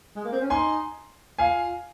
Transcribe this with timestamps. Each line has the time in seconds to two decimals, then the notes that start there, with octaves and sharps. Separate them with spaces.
0.16 G#3
0.25 A#3
0.32 C4
0.42 C#4
0.50 D#4 G#5 C6
1.38 F4 F5 G#5